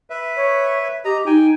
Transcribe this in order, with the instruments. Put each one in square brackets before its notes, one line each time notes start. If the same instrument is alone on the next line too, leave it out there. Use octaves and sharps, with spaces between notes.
[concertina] B4 E5
[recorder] C#5
[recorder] G4 [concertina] D#5 A#5
[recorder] D#4 [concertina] G5 G#5